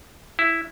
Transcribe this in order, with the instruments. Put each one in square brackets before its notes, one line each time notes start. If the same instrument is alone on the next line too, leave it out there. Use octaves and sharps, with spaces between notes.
[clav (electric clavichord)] E4